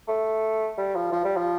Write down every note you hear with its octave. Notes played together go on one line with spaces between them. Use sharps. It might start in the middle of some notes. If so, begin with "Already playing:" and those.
A3
G3
F3
F3
G3
F3